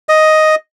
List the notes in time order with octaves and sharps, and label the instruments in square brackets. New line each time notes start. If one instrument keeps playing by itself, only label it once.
[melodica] D#5